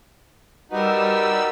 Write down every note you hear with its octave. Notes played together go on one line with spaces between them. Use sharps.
G3 D#4 F#4 A#4 B4 E6